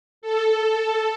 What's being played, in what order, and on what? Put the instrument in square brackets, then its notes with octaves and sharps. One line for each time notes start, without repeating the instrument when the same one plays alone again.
[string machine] A4